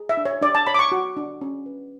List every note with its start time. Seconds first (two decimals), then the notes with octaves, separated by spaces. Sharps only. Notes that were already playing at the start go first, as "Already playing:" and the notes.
Already playing: G#4
0.09 E5
0.17 D4
0.25 C#5
0.41 D4 D5
0.55 A5
0.67 C#5 B5
0.74 D6
0.79 C#6
0.92 F#4
1.17 D4
1.41 C#4
1.66 B4